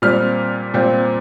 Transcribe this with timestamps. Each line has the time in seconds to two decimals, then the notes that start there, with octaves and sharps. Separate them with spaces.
0.02 A#2 G3 C4 F4 F6
0.74 A#2 G3 C4 F4